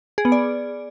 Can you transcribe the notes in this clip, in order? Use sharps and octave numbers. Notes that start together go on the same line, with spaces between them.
G#4
B3
D5